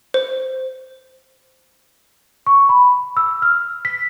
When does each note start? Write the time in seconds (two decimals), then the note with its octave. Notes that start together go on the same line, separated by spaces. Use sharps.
0.14 C5
2.47 C#6
2.69 B5
3.17 E6
3.42 F6
3.85 B6